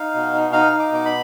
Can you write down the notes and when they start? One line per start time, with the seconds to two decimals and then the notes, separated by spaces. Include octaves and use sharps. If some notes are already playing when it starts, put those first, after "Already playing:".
Already playing: D#4 F5
0.14 B2
0.33 D#4
0.52 D#4 F5
0.72 D#4
0.80 D6
0.92 B2 D6
1.05 B5